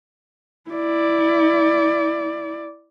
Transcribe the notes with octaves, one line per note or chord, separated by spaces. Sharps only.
E4 D5